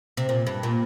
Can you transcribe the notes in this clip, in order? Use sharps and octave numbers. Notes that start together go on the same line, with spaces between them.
C3
A#2
G2
A#2